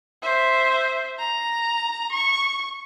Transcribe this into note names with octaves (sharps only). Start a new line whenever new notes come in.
C5 E5
A#5
C#6